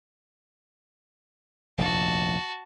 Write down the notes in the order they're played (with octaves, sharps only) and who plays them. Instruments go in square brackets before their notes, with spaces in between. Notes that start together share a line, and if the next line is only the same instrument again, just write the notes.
[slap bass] F1 A#1 D#2 [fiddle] F#4 A5